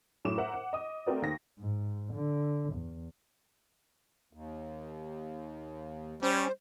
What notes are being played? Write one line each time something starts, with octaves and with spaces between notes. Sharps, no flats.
F#2 A2 F#3 D6 E7
A#4 C5 E5 F#5
F#5
D#5 D#6
A3 C4 F#4 A#4 C5 D5
D#2 A#6
G#2
D3
E2
D#2
G3 C#4 C5